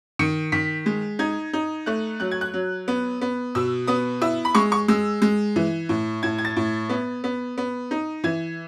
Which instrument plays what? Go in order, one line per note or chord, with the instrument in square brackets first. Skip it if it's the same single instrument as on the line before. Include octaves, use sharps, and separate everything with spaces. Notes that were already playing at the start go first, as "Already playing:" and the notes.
[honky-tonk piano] D#3 C#7
D#3 B6
G#3
D#4 G#6
D#4
A3 F#6
F#3 F#6
G#6
F#6
F#3
B3
B3
B2 E6
B3 D#6
E4 E6
B5
G#3 C#6
C#6
G#3 E6
G#3
E3
A2
A2 G#6
G#6
A6
A2
B3
B3
B3
D#4
E3 G#6